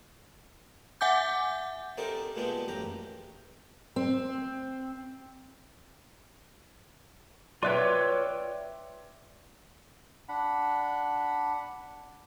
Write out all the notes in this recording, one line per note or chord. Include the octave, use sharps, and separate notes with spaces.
E5 F#5 G#5 D6 G6
C4 D4 D#4 G4 A4 A#4
A#2 G#3 B3 D4 G4
A1 F#2 G4 A#5
C4
F4 B4 C#5 D5 E5 G5
D4 F#5 B5